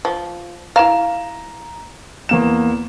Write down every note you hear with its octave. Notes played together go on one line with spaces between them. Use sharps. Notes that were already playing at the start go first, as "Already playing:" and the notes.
F3
E4 F5 A#5 E7
E2 A#3 E7